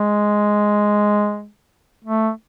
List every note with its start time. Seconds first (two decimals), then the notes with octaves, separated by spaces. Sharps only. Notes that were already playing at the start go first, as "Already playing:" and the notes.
Already playing: G#3
2.04 A3